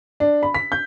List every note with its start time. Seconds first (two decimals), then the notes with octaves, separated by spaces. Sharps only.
0.20 D4
0.43 B5
0.54 B6
0.72 G6